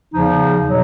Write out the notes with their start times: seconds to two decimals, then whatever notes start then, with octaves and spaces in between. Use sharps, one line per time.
0.14 E2 C#3 F3 D#4
0.68 B2 F#3